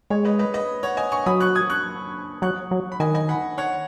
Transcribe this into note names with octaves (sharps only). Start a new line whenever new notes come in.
G#3 C#5
B4 D#5
B4 D#5
B4 D#5
C#5 F#5
D#5 G#5
G#5 C#6
F#3 B5 D#6
C#6 F#6
D#6 G#6
C#6 F#6
F#3 C#6 F#6
F#3
B5
D#3 D#5 G#5
D#5 G#5
F#5 B5
C#5 F#5